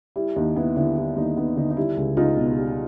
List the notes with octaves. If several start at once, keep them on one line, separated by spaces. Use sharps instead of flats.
G3 E4
D#2 D#4
B3 E4
D3 E4
G3 E4
D#2 D#4
B3 D#4
D3 D#4
D#4
G3 E4
C#2
C#2 D#4 F4
B2
G3